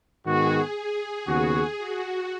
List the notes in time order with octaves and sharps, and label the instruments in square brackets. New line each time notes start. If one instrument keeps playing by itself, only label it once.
[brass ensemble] G#2 D#3 B3 F#4 [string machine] G#4
[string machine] G#4
[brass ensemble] D#2 C#3 B3 F#4
[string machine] F#4